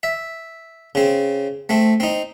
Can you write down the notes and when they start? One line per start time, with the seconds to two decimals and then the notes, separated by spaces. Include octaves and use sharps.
0.03 E5
0.95 C#3 C4
1.69 A3 C4
2.00 C4 D#4